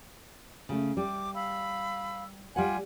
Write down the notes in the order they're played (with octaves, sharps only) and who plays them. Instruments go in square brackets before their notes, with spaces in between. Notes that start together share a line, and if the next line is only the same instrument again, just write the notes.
[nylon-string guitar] C#3 A3
[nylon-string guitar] G3 [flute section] D6
[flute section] F5 B5 E6
[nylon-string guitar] G3 F#5 [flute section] F4 G#5